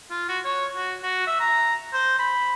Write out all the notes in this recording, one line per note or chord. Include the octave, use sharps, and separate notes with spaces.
F4
F#4
C#5
F#4
F#4
E5
A#5
C5
B5